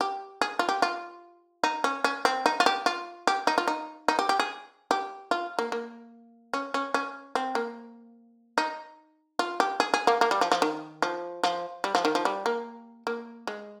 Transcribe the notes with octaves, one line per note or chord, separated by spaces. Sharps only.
G4
G#4
F4
G4
F4
D#4
C#4
C#4
C4
D#4
F4
G4
F4
G4
D#4
F4
D#4
D#4
G4
G4
G#4
G4
F4
A#3
A#3
C#4
C#4
C#4
C4
A#3
D#4
F4
G4
G#4
G#4
A#3
A#3
G3
F3
F3
D#3
F3
F3
G3
F3
D#3
F3
G3
A#3
A#3
G#3